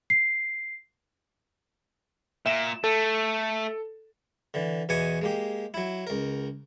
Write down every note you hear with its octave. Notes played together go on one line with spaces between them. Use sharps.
C7
A#2 E5 E7
A3 A4
D3 E3
E2 B2 E3 G#5 C#6 D#6
G#3 A#3 G4
F#3 E4
C#2 A#4